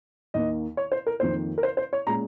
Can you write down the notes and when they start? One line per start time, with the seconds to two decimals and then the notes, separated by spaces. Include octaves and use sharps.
0.34 D#2 D#3 A#3 D#5
0.77 C#5
0.92 C5
1.07 A#4
1.20 F2 D#3 A#3 C5
1.58 A#4
1.63 C5
1.77 C5
1.93 C#5
2.07 A#2 G#3 C#4 A#5